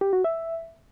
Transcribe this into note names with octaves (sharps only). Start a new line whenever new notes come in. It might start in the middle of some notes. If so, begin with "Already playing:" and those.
G4
F#4
E5